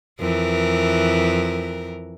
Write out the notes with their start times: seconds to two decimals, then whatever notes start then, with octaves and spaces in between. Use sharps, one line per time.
0.20 F2 E3 A#4